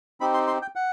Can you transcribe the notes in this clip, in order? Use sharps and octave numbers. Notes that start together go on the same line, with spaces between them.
C4 D#4 G4 B5
C6
C6
G5
F#5